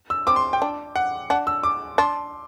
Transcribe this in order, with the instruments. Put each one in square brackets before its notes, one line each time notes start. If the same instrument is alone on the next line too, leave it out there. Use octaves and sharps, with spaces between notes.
[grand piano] E6
[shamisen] C4 [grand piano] D6
[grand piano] C6
G5
[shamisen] D4
[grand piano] F#5
[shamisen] D4 [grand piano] F#5
[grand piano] E6
D6
[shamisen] D4 [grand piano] C6